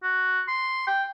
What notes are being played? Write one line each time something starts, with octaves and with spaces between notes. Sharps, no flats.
F#4
C6
G5